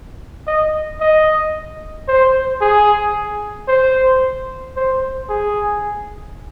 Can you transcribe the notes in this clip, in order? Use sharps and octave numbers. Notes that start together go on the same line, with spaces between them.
D#5
D#5
C5
G#4
C5
C5
G#4